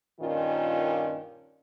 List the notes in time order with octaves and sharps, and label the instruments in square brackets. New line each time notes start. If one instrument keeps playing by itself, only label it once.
[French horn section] G2 A#2 D#3 C#4 F4